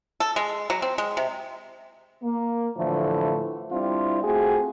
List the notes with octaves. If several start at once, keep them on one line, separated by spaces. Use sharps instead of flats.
A4
G#3
F#3
C4
G#3
C3
A#3
A2 D3 E3 F3 A3
G3 C4 D4 E4 F4
A3 C4 F4 F#4 G#4